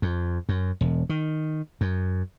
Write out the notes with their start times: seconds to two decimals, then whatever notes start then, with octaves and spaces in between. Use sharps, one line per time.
0.02 F2
0.49 F#2
0.81 E1
1.09 D#3
1.81 F#2